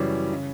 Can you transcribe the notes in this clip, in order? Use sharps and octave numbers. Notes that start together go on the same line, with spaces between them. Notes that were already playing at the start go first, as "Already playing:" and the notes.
Already playing: F#2 C#3 E3 G3 C#4
C#3